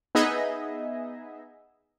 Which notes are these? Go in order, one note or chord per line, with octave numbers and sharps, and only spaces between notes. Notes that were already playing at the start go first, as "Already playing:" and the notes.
B3 D#4 G#4 D#5 E5